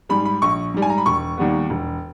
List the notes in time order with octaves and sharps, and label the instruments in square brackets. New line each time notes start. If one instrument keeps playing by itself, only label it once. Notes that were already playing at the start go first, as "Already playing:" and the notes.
[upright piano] G#2 G3 B5
B5
A#1 C#6
G#2 G3
G#5
A#5
B5
E1 C#6
D#2 D#3 G3 B3
E1